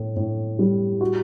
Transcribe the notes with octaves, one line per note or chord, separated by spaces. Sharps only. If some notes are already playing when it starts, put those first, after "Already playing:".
Already playing: A2
A2
G3
F#4